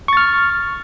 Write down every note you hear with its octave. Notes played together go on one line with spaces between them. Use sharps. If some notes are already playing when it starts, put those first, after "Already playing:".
C#6 F6 A6